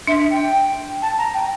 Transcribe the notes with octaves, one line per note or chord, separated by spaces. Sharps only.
D4 E5
G5
A5
A#5
G5